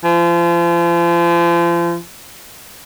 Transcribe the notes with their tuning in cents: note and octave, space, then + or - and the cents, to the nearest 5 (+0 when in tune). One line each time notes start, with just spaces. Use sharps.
F3 -35